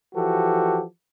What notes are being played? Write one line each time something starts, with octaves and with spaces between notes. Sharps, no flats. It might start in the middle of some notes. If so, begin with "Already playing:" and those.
E3 F3 F#4 G4 A4